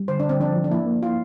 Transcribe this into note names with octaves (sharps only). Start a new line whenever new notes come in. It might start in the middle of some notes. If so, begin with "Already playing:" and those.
Already playing: G3
D3 C5
D4
D3 C4
F3 D4
F3
D4
A#3 E4
A#3
E4 F4